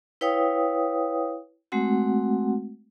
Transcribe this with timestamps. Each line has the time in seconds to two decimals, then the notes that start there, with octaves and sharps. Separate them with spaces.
0.21 E4 B4 C#5 F5 G5 D#6
1.72 G#3 A3 C4 F#4 F#5